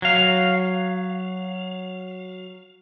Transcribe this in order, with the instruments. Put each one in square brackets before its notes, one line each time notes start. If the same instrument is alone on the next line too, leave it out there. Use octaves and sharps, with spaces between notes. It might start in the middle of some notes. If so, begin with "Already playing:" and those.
[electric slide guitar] F#3 F5